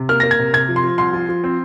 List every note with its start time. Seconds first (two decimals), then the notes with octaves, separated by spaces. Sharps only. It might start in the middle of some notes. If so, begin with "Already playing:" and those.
Already playing: C3
0.09 A#3 F6
0.20 A#3 A#6
0.31 G#6
0.39 C3
0.53 C3 G#6
0.69 F3
0.76 C6
0.83 F3
0.98 C2 C6
1.13 F3
1.29 F3
1.44 C4